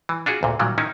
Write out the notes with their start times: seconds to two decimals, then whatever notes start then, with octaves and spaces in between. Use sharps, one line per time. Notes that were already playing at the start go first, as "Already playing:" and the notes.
0.09 E3
0.26 D4 F4 F#4 G#4
0.43 D2 A#2
0.59 A#2 D#3 F#3 G3
0.78 D#3 C#4 D#4 E4